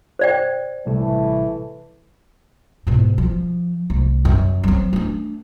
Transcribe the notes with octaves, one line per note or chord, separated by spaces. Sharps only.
C5 D5 G5
A1 C3 E3 G3 A3
G#2 B2
F3
C2 A3
F#2
F#3 C4
A3 D4